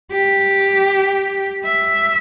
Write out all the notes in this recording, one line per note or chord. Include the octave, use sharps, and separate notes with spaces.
G4
E5